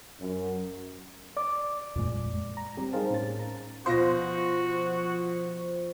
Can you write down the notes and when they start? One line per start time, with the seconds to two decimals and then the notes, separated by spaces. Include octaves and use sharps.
0.19 F#2
1.37 D5 D6
1.96 F2 A#2 G#3
2.57 A#5
2.77 G3 C4 G4
2.93 D#4 G#4 A#4 C5 F5 A5
3.10 A2 C#4 A6
3.39 A#5
3.86 B2 F3 F4 F#4 C5 A#6